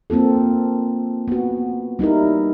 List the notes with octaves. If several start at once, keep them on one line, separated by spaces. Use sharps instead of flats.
A#3 C4 F4 A4
B3 F#4
G3 D#4 E4 A#4